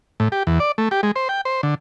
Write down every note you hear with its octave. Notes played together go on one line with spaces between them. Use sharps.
A2
G4
E2
D5
A3
G4
G#3
C5
G5
C5
D3